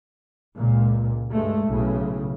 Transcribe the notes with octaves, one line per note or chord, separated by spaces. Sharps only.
C#2 A#2
G2 G#3 A3
B1 A2 C#3